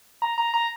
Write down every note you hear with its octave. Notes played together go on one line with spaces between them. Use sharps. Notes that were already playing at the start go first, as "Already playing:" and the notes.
A#5
A#5
A#5